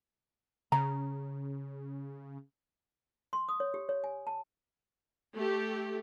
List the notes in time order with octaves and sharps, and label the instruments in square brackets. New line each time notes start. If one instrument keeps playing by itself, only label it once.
[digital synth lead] C#3 [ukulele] A#5
[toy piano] C6
D#6
C#5
G4
C#5
G#5
A5
[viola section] A3 G4